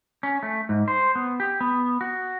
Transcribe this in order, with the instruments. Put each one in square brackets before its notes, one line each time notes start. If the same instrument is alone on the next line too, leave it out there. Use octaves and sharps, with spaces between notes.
[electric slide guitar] C#4
A3
G#2
C5
B3
G4
B3
F#4